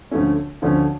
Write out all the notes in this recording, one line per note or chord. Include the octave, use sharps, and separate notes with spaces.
D2 D3 F3 A3 C#4
D2 D3 F3 A3 C#4